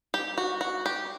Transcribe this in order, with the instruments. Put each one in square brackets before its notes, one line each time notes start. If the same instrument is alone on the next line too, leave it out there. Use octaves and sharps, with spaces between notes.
[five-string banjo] G4
F#4
F#4
G4